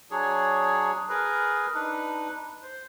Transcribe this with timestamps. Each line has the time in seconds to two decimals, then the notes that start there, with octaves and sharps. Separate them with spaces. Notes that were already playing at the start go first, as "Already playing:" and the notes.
0.11 F#3 D4 G#4 C#5
1.09 G#4 A#4 B4
1.74 D4 D#4 B4
2.62 C5